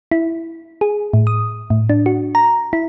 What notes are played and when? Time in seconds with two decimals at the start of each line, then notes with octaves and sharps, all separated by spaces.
0.12 E4
0.81 G#4
1.14 A2
1.27 D#6
1.70 A2
1.90 D4
2.06 F#4
2.35 A#5
2.73 E4